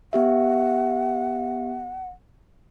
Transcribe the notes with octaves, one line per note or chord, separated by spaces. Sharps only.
B3 G4 E5 F#5